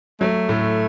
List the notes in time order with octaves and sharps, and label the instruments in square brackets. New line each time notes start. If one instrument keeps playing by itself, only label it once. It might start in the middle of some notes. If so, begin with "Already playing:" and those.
[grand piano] F#3 [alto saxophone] A3
[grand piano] A2